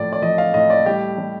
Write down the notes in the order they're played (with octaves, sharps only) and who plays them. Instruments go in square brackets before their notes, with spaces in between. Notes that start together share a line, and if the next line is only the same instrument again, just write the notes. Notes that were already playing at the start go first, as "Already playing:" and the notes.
Already playing: [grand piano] A2 F3 D5
D5
F3 D#5
F5
A2 D#5
D5
G3 G4
G3